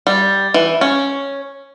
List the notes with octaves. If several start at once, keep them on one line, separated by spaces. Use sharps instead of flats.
G3
E3
C#4